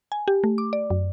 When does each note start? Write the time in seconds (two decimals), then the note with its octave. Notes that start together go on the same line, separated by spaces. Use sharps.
0.12 G#5
0.28 G4
0.44 A3
0.58 D6
0.73 D5
0.90 F#2